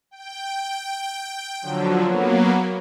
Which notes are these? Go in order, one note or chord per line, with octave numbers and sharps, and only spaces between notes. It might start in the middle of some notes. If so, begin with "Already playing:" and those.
G5
D3 F3 F#3
F#3 A#3 B3